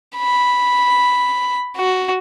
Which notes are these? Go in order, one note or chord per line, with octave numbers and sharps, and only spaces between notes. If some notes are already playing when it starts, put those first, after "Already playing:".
B5
F#4